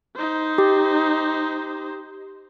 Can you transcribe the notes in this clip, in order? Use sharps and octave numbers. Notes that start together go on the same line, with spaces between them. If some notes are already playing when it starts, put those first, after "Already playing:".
D#4 C5
G4